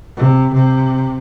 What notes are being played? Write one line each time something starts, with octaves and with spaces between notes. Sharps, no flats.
C3
C3